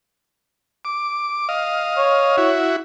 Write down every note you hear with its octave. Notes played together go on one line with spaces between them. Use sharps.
D6
D#5 F5
C#5
E4 F#4